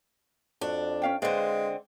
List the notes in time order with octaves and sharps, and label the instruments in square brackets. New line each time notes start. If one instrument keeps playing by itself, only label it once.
[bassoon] F2 [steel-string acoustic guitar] D4 [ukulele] F#4
[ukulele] C#4 F5 G5
[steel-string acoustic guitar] D3 C4 [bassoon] G#3 [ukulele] B4 D5 F5